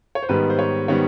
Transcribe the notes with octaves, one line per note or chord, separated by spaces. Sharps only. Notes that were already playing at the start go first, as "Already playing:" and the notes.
C#5
C5
G#2 D#3 G3 B3 B4
C5
C#5
D#3 G3 B3 C#5